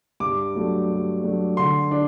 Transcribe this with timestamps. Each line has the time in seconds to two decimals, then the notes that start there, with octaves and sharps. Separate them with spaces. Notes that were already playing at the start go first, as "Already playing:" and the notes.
0.20 G2 D6
0.55 F#3 A3 D4
0.89 G2
1.23 F#3 A3 D4
1.57 D3 C6
1.91 D4